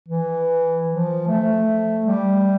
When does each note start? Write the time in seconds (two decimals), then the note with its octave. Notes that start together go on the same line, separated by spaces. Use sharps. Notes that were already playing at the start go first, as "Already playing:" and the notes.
0.09 E3
0.88 F3
1.28 A3
2.06 G3